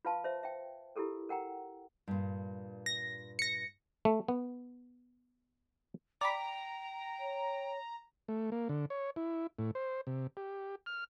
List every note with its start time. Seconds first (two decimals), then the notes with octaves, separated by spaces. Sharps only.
0.05 F4 B4 F5 A5 C6
0.24 C5 E5
0.43 E5 G5
0.96 E4 F4 G4 A4 A#4
1.29 A#4 F#5 G5 A#5
2.08 G2 A#2
2.86 A#6
3.39 A#6 C#7
4.05 A3
4.28 B3
6.21 D5 G5 A#5 B5
7.19 C#5
8.28 A3
8.52 A#3
8.69 D3
8.90 C#5
9.16 E4
9.59 A2
9.75 C5
10.07 C3
10.37 G4
10.86 F6